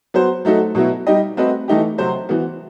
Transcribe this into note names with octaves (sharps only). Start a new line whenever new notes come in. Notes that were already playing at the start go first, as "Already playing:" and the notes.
F#3 B3 F#4 C5
F#3 A3 D#4 F#4 A4
B2 F#3 B3 E4
G3 D#4 G4 D#5
A3 C4 F#4 B4 D#5
E3 A3 D#4 G4
C3 F#3 C4 F#4 C5
E3 B3 F#4